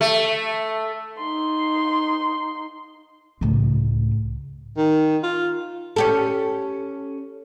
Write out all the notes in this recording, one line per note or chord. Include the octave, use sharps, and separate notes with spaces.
A3
D#4 C6
C#2 A2
D#3
F4
C#4 G4 A4